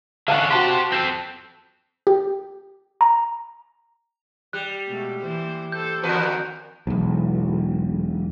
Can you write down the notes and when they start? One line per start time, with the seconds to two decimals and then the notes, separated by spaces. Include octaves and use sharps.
0.28 D3 C#4 F5 A5 F#6
0.50 F#4 G4 C5 A5 C6
0.92 C4 A4 G6
2.07 G4
3.01 A#5
4.53 G3 F#6
4.87 B2 G#3 A3
5.21 E3 A#3 C5
5.72 A4 C5 G6
6.03 E2 D#3 F#4 A#4 B4
6.87 E1 B1